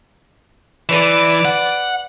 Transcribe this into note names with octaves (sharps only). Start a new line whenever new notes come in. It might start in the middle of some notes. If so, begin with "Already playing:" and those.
E3 B4 D5
F#5